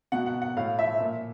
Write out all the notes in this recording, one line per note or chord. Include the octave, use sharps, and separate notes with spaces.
B2 F#5
F#5
F#5
A2 F5
F3 E5
A#2